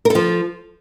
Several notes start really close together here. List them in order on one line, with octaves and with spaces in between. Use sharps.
A#4 A4 F3